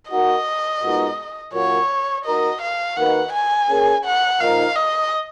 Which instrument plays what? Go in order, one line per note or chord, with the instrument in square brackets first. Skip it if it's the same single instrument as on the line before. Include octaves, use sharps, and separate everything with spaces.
[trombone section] A#3 D#4 F#4 [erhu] D#5
[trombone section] A#2 G#3 B3 D#4 F#4
[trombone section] A#2 F#3 A#3 C#4 F#4 [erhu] C#5
[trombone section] A#3 D#4 F#4 A#4 [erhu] D#5
[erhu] F5
[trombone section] D#3 A#3 D#4 F#4 B4 [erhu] F#5
[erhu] G#5
[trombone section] A#3 C#4 G#4
[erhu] F#5
[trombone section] A#2 F3 A#3 D#4 [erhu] F5
[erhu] D#5